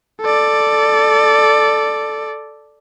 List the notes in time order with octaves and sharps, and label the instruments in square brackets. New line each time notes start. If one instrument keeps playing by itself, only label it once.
[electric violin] A4 D5